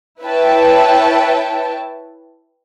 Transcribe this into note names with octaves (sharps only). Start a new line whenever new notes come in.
E4 B4 C#5 E5 G5 A5